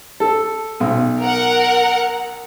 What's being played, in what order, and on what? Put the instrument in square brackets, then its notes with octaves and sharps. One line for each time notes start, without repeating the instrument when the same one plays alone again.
[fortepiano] A4
B1
[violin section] A#4 F#5